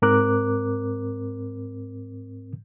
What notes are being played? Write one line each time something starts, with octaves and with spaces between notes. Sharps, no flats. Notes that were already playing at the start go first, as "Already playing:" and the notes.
G#2 C4 A#4 D6 F#6